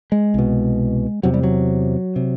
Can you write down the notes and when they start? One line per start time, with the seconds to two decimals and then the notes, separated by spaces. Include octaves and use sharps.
0.12 G#3
0.34 C2 B2
1.23 E2 C3 F#3
1.34 G3
1.43 F#3
2.16 C3